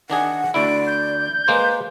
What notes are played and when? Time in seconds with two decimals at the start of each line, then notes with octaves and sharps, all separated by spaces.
0.10 D#3 D4 G#4 F#5
0.54 D2 D3 E4 D5 D7
0.87 G6
1.48 G#3 A#3 B4 C5